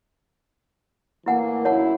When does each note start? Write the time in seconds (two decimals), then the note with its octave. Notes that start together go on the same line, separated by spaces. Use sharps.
1.26 A2 E3 A#3 E4 F#5 G#5
1.65 F#2 E4 C#5 F#5 A5